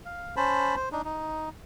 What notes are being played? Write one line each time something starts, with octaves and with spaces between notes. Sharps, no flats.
F5
C#4 C5 A5 B5
C5
D4 D#4
D#4